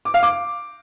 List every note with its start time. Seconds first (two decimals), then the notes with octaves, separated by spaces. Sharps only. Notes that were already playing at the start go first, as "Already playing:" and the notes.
0.05 D6
0.14 F5
0.23 D6